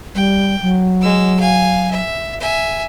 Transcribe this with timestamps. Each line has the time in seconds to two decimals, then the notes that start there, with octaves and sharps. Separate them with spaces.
0.15 G3 G5
0.62 F#3
1.01 G#3 E6
1.40 F5 G#5
1.91 E5
2.40 E5 G#5